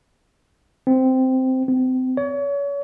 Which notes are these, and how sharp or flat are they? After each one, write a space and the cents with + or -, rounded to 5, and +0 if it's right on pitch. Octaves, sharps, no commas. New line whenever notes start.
C4 -10
C4 -30
C#5 +35